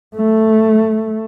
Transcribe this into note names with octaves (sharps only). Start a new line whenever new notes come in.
A3